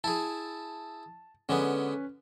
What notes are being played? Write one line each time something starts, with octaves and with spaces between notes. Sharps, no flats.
E4 G#4 A5
D3 G#3 B3 C#4 B4